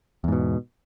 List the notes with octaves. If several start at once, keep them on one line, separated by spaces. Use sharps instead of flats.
E2 G#2 B2